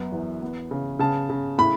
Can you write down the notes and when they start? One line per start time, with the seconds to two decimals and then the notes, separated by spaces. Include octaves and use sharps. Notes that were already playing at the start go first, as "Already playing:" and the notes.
Already playing: F#2 B3
0.12 E2
0.42 B3
0.71 C#3
0.99 C#3 A5
1.29 C#3
1.58 A2 B5